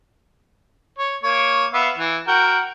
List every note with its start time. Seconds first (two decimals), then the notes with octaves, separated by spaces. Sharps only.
0.99 C#5
1.23 A#3 C#5
1.73 B3 E5 F5
1.98 E3
2.28 F#4 A#4 G5